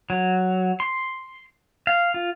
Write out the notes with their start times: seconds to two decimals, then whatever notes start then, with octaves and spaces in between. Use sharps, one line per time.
0.10 F#3
0.80 C6
1.87 F5
2.14 F4